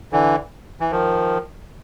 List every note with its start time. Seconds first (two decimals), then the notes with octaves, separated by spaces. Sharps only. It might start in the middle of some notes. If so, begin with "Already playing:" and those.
0.12 D3 E3
0.80 E3
0.91 D#3 F3